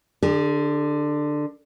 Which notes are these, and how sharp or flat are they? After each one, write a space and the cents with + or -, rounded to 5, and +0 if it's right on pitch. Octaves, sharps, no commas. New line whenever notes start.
D3 +15 G#4 -40